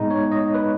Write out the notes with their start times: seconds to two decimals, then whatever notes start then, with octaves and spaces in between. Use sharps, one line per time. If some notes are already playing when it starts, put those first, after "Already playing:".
Already playing: A2 G#3 B3 D#4
0.10 C#5
0.32 D#5
0.54 B4